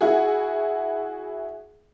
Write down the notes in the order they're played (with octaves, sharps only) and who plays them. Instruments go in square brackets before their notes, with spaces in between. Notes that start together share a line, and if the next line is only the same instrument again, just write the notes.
[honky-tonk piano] E4 F#4 G#4